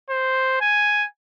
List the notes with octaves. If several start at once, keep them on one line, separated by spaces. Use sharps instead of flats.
C5
G#5